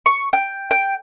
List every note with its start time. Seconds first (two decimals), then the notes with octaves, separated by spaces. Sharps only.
0.06 C#6
0.33 G5
0.71 G5